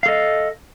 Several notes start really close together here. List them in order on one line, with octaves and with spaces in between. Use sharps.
F5 A4 D#5